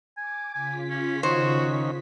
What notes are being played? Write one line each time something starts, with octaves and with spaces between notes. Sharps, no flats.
G#5 D6
C#3 F4 G#5 B6
C#4
D#3 C#4 F#4 C5
B6